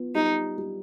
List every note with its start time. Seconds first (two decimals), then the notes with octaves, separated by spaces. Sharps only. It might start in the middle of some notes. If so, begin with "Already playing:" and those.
Already playing: B3 F4
0.15 G3 D#4
0.58 G3